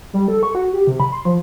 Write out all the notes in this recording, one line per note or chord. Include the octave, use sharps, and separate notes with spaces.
G3
A4
C#6
F#4
G4
C3
B5
C6
F3